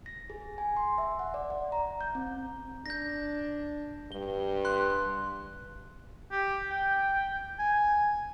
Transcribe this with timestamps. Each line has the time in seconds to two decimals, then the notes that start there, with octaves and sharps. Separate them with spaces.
0.06 A#6
0.30 G#4
0.58 G#5
0.77 C6
0.98 E5
1.19 F#5
1.34 D5
1.50 D5
1.72 A#5
2.01 G6
2.15 C4
2.86 D4 G6 A#6
4.12 G2 G7
4.65 C6 F#6
6.31 G4
6.70 G5
7.59 G#5